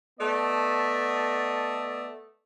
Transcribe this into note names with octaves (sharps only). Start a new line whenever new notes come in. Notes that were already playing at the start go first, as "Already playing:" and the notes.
A3 B3 D5 D#5 A5